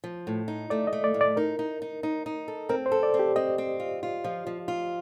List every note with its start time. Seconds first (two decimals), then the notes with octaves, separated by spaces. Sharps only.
0.04 F3
0.27 A2
0.48 D#4
0.70 A3 D5
0.87 D#5
0.93 A3
1.04 D5
1.14 A2
1.21 D5
1.37 D#4 A#4
1.59 D#4
1.82 D#4
2.03 D#4
2.26 D#4
2.48 A4
2.69 C4 A#4
2.86 C5
2.92 A4
3.03 D5
3.14 C4
3.19 G4
3.36 C4 D#5
3.58 C4
3.80 F4
4.03 F4
4.24 F3
4.47 F3
4.68 F4